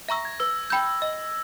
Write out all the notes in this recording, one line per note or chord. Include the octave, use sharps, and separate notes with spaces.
E5 A#5 C#6 E6 A#6
G#6
B4 E6
G5 B5 G6
D#5